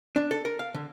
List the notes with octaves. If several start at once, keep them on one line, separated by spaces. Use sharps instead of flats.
D4
A4
A#4
F5
D3